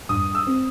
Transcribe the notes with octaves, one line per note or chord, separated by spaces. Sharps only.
G2 D#6
E6
C4